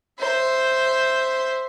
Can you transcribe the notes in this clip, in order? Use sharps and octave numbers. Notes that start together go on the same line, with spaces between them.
C5 E5